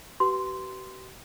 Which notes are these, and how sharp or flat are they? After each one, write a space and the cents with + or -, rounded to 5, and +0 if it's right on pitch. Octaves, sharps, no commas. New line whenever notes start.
G4 -45 B4 +0 C6 -10